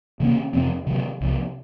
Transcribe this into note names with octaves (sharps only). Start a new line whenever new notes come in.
C3 D#3 A#3 C#4
F2 C3 F3 C4
C3 D#3 F#3
C2 C3 F3